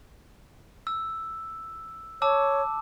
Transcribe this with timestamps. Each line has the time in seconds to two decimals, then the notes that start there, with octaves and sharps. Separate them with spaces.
0.87 E6
2.22 C#5 A5 D6 E6